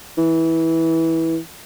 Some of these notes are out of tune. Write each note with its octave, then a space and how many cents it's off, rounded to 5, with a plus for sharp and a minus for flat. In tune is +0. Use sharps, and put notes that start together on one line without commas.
E3 -15